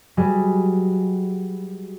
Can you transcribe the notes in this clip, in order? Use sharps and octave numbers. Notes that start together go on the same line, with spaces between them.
F#3 G3 G#4 B4 D#5